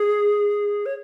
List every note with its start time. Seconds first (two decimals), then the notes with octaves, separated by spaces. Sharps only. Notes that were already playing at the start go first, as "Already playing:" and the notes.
Already playing: G#4
0.86 C#5